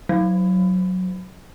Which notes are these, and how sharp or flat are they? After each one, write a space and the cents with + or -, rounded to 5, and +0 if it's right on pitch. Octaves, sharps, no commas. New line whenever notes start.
F#3 -5